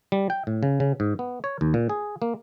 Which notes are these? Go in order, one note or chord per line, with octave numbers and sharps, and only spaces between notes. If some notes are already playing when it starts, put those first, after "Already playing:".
G3
G5
A2
C#3
C#3
G#2
B3
C#5
D#2
A#2
G#4
A#3